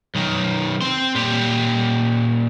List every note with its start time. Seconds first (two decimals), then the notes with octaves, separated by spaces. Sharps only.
0.15 B1 D#3
0.81 C4 C6
1.15 A#2 G4